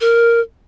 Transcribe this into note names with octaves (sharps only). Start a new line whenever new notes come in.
A#4